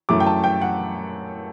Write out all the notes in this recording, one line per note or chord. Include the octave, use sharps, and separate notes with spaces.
F#2 E3 A3 D6
G5
A5
G5
F#5